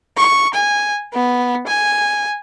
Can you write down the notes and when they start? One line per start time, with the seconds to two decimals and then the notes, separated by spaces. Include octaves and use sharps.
0.17 C#6
0.54 G#5
1.13 B3
1.67 G#5